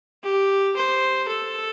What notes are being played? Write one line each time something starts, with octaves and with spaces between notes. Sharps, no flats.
G4
C5
A4